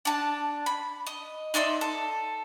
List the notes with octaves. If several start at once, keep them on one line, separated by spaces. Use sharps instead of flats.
D4 A5
B5
D#5
D#4 D5 E5 C6
A4